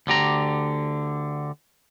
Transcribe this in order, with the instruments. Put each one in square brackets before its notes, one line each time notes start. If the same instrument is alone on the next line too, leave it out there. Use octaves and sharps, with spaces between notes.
[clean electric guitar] D2 D3 G4 A#5